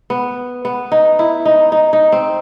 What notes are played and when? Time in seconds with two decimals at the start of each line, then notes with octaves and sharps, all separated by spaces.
0.10 B3
0.65 B3
0.92 D#4
1.19 E4
1.45 D#4
1.72 D#4
1.93 D#4
2.12 C4